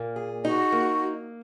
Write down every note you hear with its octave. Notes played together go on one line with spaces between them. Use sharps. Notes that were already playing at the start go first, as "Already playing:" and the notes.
Already playing: A#2 A#3
G#4
D#4 F#4
A#3